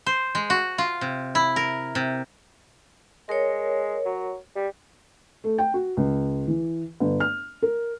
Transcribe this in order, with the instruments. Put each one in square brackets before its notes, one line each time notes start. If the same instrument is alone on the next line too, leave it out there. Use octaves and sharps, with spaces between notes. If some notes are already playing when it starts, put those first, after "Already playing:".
[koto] C5
G#3
F#4
F4
C3
E4
A#4
C3
[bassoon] G#3 [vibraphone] A#4 C#5
[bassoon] F#3
G3
[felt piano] A3
G5
F#4
C#2
E3
G1
F6
A#4